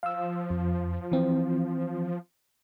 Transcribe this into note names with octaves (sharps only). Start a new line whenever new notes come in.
F3 F5 E6
F2
E3 C4